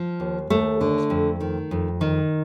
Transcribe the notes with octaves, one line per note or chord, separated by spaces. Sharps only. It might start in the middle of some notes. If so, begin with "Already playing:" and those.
Already playing: F3
D#2
D#2 A3
D3
F2
D#3
F2
D#3